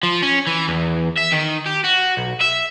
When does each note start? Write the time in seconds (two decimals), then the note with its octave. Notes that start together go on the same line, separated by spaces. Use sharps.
0.03 F3
0.22 C#4
0.47 E3
0.68 E2
1.17 E5
1.32 D#3
1.66 G4
1.84 F#4
2.17 B1
2.41 E5